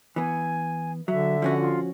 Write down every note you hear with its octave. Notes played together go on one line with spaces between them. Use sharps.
E3 B3 G#5
D3 F#3 E5
F3 C#4 F#4
F4